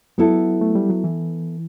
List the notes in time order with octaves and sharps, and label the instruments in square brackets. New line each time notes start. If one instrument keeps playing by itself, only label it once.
[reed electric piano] F#3 [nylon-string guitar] B3 E4 A4
[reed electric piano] A3
G3
F#3
E3